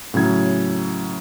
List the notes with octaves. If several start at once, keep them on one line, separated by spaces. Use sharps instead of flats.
A2 C#3 F#3 G#6